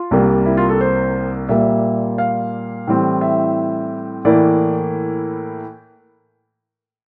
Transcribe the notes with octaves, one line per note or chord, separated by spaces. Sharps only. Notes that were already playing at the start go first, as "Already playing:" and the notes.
Already playing: F4
C2 C3 G3 A#3
E4
F4
A4
C5
A#2 G3 A#3 E5
F5
A2 E3 G3 C4
E5
A2 E3 A#3 D5